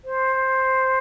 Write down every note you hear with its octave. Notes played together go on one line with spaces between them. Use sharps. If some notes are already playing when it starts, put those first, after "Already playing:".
C5